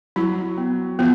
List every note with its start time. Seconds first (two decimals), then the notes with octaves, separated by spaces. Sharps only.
0.16 F#3 E4
0.58 B3
0.99 F3 B3